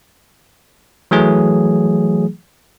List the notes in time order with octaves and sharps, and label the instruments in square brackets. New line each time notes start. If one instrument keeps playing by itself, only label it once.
[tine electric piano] E3 F#3 A3 G#4